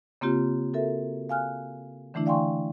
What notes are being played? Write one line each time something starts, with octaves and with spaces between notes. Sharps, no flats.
C#3 A#3 C4 F4 G4
F#4 A4 A#4 E5
F5 G#5 F6 F#6
D3 E3 A3 D4 E4
D5 F5 G5 G#5 C6 C#6